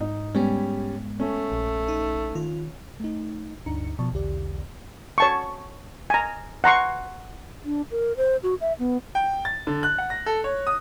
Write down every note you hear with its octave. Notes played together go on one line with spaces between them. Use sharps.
G#2 D#4
G3 G#3 B3 C#4
A3 C#4
A#1
D#4
D#3 F4
A3 D#4
D2 G2 D4 D#4 A#5 C#7
B2 F3 D5 A5 C#6
B1 E2 D3 G4 D5
C#5 A5 C#6
G#5 A#5
F#5 A#5 C6 C#6
D4
A#4
C5
F#4
E5
B3
G5
A6
D3
F#6
F#5
A#6
A4
C#5
D#6